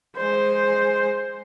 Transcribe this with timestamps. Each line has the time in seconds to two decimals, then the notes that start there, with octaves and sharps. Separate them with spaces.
0.17 G#3 C5